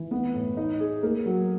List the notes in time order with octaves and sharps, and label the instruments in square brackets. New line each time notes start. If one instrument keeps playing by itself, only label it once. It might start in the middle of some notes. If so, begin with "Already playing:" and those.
Already playing: [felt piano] E3
B3
A2
D#4
G#4
A#3
F#3